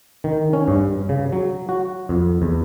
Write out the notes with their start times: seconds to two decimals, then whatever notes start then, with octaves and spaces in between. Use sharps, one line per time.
0.24 D#3
0.53 C#4
0.68 G2
1.09 C#3
1.33 F#3
1.69 F#4
2.09 F2
2.42 E2